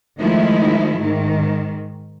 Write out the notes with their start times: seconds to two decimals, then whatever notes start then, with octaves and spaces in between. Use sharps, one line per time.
0.20 D#3 F3 G#3 A3 D#4 E4
1.01 G#2 D#3